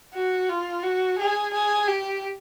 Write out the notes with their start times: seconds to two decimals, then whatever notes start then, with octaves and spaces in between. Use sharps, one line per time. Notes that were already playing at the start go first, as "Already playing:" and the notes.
0.14 F#4
0.49 F4
0.83 F#4
1.18 G#4
1.53 G#4
1.88 G4